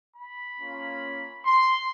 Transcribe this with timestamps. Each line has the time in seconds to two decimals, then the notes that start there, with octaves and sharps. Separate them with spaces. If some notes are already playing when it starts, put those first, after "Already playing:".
0.16 B5
0.60 A#3 C#4 F4
1.45 C6